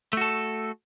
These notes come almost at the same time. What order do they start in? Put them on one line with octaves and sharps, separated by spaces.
A3 F#4 A4